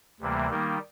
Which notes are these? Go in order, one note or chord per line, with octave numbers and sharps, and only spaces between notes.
D2 C3 E3 G3 A#3
D#3 G3 A#3 D#4